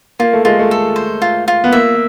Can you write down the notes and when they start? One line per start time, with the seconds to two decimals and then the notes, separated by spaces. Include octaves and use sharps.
0.19 A#3 F4
0.33 A3
0.45 G#3 F4
0.59 A3
0.71 A4
0.96 C5
1.22 F4
1.48 F4
1.64 B3
1.73 A#3 E5